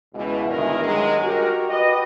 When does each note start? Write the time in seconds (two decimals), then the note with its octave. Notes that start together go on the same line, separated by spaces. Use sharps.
0.14 C#2 B2 E3
0.48 G1 E2 D#3 E3 G#3 A#4
0.83 G2 D#3 F#3 G#3
1.24 F#4 G4 A#4
1.69 F#4 G4 B4 D#5